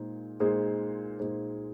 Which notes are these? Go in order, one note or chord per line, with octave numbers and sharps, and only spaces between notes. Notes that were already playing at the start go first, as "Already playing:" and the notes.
Already playing: A#2 G#3 D#4 G#4 C5
A#2 G#3 D#4 G#4 C5
A#2 G#3 D#4 G#4 C5